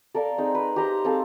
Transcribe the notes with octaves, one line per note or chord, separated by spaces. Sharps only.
A4 A#4 D5 F5
C4 D#4 G#4
B4
G4 C5 A#5 C6
C4 G#4 A4 F5